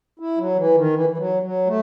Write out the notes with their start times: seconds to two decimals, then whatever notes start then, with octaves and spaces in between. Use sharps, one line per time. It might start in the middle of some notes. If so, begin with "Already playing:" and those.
0.20 E4
0.38 F#3
0.56 E3
0.75 D#3
0.93 E3
1.09 E3
1.18 F#3
1.43 F#3
1.67 A3